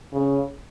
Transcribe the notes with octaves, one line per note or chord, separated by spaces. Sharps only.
C#3